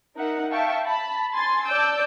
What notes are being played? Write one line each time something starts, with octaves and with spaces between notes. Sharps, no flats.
D#4 A#4 E5 F#5
E5 F5 G5 A5 C#6
A5 B5
G#5 C6 A6
D5 A5 D6 E6 G6